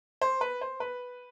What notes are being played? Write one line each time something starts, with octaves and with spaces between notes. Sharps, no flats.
C5
B4
C5
B4